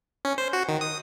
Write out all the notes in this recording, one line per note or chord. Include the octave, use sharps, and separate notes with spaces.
C#4
C5
F#4
D#3
D#6